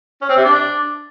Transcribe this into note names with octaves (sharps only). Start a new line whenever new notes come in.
C#4
C4
C3
D4